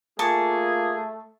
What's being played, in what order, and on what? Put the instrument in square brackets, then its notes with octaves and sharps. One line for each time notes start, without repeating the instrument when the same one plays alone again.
[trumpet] A3 [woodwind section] A#3 F4 G#4 [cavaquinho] A5 C#6